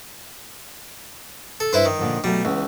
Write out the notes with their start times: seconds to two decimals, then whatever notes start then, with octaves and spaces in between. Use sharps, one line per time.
1.60 A4
1.73 G2 E4 B4 C5
1.85 D#3
1.99 A#2 D3 F3
2.24 B2 F#3 G3 A3
2.45 C#2 E3